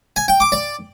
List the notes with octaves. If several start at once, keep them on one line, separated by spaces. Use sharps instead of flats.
G#5
G5
D6
D5